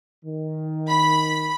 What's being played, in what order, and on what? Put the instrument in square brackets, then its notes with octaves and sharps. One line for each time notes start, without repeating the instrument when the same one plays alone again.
[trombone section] D#3
[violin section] B5